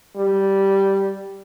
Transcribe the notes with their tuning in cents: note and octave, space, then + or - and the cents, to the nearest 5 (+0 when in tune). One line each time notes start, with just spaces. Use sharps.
G3 -5